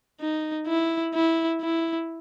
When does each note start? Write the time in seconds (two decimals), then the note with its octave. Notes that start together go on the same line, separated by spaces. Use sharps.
0.21 D#4
0.67 E4
1.14 E4
1.62 E4